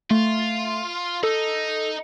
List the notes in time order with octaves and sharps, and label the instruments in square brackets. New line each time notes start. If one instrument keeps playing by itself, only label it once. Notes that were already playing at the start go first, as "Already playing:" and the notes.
[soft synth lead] A3 [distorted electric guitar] F4
[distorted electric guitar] D#4 [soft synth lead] A4